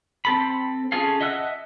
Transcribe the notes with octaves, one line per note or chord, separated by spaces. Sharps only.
C4 A4 B5
C#4 F4 G#4 A4 F5
D#5 E5 F#5 E6 F#6